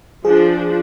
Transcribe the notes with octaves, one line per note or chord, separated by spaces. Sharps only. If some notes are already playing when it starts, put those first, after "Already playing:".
F3 D4 G#4